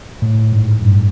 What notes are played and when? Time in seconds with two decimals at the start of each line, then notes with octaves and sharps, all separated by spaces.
0.22 A2
0.53 G#2
0.82 G2